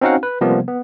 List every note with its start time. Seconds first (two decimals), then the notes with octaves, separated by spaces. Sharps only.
0.01 C4 C#4 D#4 F#4 F5 F#5
0.23 B4
0.41 C3 F3 G3 A#3 B3
0.68 B3